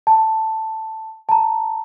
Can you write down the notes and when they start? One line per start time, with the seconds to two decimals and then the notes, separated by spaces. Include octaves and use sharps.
0.07 A5
1.29 A5 A#5